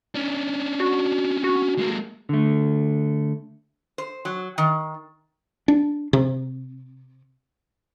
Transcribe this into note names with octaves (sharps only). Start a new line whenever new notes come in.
C#4 D4
F#4
F#4
G#3 A#3
D3 A3
C5
F#3
D#3
D4
C3